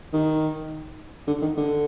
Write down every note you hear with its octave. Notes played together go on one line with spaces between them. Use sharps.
D#3
D3
D#3
D3